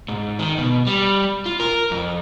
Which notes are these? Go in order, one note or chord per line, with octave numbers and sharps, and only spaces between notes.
G#2
D#3
B2
G3
F4
A#4
F2